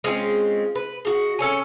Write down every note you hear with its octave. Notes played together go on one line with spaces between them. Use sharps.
G#3 C4 C#4 F4
B4
G#3 F#4
C#4 A4 C#5 G#5